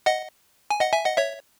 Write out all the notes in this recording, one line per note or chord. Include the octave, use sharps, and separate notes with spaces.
D#5 F#5
G#5
D#5 F#5
E5 G#5
D#5 F#5
C#5 E5